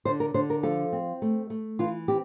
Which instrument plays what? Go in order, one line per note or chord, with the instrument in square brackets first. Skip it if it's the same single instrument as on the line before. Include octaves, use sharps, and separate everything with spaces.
[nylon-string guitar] D3 C5
A#4
D3 C5
A#4
F3 A4
C4
A3
A3
E3 F4
C4 G4